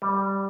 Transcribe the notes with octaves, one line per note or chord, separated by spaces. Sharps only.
G3